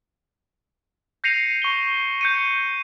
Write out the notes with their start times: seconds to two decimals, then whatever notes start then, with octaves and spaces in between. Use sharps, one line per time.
1.24 G6 A#6 C7 C#7 D#7 F7
1.62 C#6 G7
2.21 G6 C#7 D#7